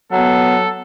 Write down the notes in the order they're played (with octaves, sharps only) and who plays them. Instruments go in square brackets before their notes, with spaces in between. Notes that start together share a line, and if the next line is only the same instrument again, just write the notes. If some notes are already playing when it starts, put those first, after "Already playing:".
[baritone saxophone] F#3 [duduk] B3 [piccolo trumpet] A4